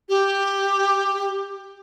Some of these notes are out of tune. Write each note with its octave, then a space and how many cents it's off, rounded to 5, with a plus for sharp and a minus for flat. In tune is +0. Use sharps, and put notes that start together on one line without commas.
G4 +10